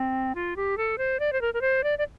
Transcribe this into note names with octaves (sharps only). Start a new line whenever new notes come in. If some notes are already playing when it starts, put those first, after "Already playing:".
Already playing: C4
F4
G4
A4
C5
D5
C5
A#4
A#4
C5
D5
D5